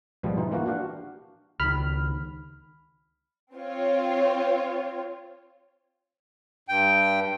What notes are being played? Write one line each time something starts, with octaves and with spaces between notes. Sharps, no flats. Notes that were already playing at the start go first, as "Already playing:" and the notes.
G#2 B2 F3 G3 B3
E3 D#4 C5
E3 A#3 F4 F#4
D4 F#4 G4 F5 F#5
C#2 D#3 B5 F6
C4 F4 C#5
G2 G5